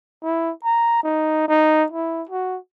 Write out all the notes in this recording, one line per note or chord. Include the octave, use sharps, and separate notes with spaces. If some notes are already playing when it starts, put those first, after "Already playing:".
E4
A#5
D#4
D#4
E4
F#4